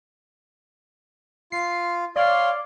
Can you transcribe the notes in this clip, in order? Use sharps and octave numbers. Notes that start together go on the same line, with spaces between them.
F4 C7
C#5 D5 F5 C6